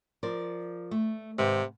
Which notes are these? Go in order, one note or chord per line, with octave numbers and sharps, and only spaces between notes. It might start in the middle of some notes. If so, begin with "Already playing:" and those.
F3 A#4 D5
A3
G#2 C3 D#3 B4